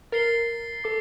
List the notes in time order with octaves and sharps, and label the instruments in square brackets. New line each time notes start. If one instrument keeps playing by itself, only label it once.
[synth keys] A#4 [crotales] A6 C7 G7
[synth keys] A4 [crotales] D6